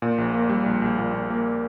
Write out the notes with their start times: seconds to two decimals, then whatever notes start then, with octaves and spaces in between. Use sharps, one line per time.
0.02 A#2
0.18 A#1
0.34 A#3
0.49 G3
0.66 A#1
0.82 A#1
0.98 A#2
1.14 A#2
1.30 A#3